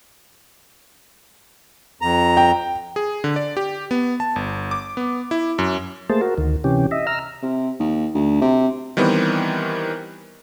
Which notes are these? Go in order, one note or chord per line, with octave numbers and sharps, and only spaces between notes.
F2 A#5
G5
G#4
D3
D5
G4
B3
A5
G1
D6
B3
E4
F#2
A3 A#3 G#4 C5 A5
F#4 A#4
D2 D#3
C3 E3 C#4 G4
D#5 E5
A#5 E6 F6
C3
D#2
D2
C3
D#3 E3 G3 B3 C4